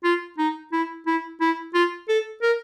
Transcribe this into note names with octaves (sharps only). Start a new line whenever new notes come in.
F4
D#4
E4
E4
E4
F4
A4
A#4